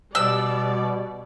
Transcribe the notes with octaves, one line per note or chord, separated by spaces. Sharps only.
B2 G3 D5 E6